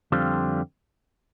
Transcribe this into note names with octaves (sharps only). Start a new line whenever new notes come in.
F2 D3 G3 C4 F4